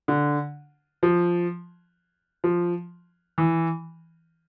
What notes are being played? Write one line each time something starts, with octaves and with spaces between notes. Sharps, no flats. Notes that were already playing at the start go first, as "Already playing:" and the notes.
D3
F3
F3
E3